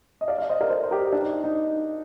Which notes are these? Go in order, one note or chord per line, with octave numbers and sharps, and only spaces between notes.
D#5
D5 F5
D5 F5
C5 D#5
A#4 D5
A4 C5
C5
G4 A#4
D4
D#4
D#4